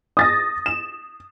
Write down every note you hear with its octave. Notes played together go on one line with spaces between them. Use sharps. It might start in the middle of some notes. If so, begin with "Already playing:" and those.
D#6 A6 A#6
E7